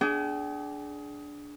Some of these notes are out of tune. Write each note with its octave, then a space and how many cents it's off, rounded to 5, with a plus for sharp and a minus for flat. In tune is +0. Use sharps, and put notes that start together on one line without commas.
D4 -10 G#4 +20 G5 -40